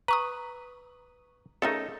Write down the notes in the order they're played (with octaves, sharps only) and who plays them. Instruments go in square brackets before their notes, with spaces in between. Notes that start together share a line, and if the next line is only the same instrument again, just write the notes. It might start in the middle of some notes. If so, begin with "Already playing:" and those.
[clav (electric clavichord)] B4 [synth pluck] A#5 C#6 D#6
[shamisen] C#3 A3 A#4 [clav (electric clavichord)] D#4 A4